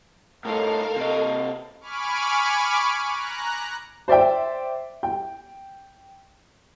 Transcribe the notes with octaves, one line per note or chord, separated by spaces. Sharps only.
A2 D#4 A4 A#4 F5
C3 D#5
G#5 B5 C#6 D6 F6
A#5 F#6
C5 D5 E5 G5
G5